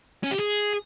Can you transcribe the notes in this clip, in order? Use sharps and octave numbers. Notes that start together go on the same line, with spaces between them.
C#4
G4
G#4